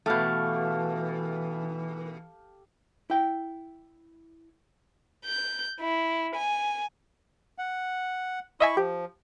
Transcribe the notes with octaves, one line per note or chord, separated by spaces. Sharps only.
B2 E3 A3 G4 A4 F5
E4 G5
G6
E4
G#5
F#5
E4 D#5 E5 G#5 B5 C#6
F3 G4